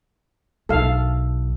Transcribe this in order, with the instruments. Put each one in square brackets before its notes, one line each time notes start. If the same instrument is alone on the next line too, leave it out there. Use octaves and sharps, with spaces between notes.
[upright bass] B1 [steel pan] A4 F5